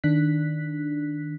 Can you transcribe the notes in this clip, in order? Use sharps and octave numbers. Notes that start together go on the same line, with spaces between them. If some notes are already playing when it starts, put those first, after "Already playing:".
D#3 D4 F#6 B6